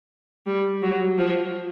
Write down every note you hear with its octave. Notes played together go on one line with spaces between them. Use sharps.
G3
F#3
F3